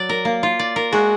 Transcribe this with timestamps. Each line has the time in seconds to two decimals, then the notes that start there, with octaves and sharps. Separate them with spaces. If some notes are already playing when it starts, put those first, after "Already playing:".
Already playing: F#3 D5
0.09 A#4
0.25 A#3
0.43 F4
0.59 D5
0.76 A#4
0.92 G#3 F#4